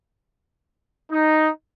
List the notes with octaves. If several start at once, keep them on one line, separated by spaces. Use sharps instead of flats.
D#4